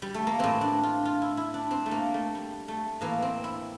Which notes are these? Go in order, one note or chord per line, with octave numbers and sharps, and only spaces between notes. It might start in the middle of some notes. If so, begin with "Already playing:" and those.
G3
A3
A#3
A2 E3 C4
D4
F4
F4
E4
E4
D4
C4
A3
A#3
A3
G3
A3
A2 E3 A#3
C4
E4